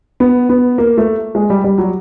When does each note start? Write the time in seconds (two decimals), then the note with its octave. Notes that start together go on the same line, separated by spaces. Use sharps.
0.20 B3
0.49 B3
0.78 A#3
0.98 A3
1.35 G#3
1.50 G3
1.64 G3
1.78 F#3